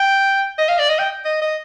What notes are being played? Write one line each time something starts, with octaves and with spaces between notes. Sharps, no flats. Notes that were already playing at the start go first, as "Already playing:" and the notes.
Already playing: G5
D#5
F5
D5
D#5
G5
D#5
D#5